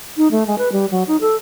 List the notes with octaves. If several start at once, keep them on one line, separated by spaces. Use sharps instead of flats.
D#4
A3
G#3
B4
G3
F#3
D#4
A4